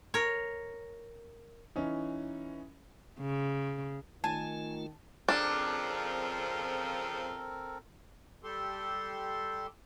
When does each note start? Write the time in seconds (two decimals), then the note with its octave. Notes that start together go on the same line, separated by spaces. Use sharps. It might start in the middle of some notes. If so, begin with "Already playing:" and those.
0.14 A#4 C#5
1.76 E3 C#4 D#4
3.20 C#3
4.24 D#3 A3 F4 G#5 A5
5.29 F2 C#3 F3 C4 D4 A4 A#4
8.44 G3 G4 A4 C6